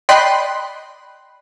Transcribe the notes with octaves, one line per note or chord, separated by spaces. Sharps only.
D5 D#5 G5 B5 C6 F#6